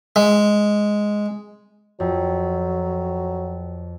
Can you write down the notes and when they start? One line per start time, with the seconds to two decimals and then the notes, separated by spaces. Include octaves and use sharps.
0.16 G#3
2.00 F2 F#3